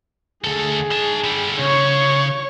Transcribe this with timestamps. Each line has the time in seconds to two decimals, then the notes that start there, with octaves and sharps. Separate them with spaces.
0.44 D2 G#4 A4
0.91 D#4 A5
1.24 D3 G3
1.59 C#3 C#5 C#6